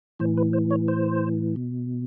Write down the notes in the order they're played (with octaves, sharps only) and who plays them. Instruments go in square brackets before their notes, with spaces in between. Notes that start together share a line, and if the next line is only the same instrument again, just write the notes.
[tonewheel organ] A2 E3 C5
B4
C5
C#5
C5
B2